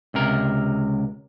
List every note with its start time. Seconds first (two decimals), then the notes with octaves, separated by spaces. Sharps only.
0.14 C#2 C3 A#4